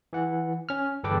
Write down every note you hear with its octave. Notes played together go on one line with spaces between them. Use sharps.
E3 F#5
C#4 F6
G1 E2 A4 B4 G5 D6